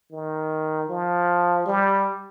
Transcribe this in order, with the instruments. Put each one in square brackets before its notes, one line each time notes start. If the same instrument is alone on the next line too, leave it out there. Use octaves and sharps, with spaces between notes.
[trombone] D#3
F3
G3